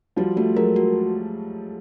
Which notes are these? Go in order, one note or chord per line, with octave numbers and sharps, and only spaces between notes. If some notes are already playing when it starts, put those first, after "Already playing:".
F3 G3 F#4
G3 A3 F#4
F#3 G#3 A#4
F#4